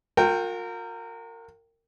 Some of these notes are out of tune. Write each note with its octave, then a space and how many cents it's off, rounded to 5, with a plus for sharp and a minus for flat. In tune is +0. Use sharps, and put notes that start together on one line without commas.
F4 +45 A#4 -25 G5 +0